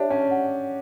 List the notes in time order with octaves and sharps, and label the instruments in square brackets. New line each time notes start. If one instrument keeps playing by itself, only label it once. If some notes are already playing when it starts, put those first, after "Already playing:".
Already playing: [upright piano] D4 G4 [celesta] C#5 E5 A5
[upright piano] C#4
[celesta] F#5